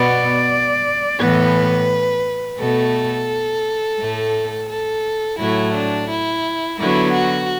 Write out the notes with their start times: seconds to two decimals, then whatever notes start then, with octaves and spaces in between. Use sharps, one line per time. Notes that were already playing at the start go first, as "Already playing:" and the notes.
Already playing: B2 B3 D5
1.18 A2 E3 B3 B4
2.58 B2 A3 A4
3.99 A2 A3
4.69 A4
5.39 A2 F#3 A3 E4
5.73 D4
6.09 E4
6.78 D3 F#3 B3 E4
7.13 F#4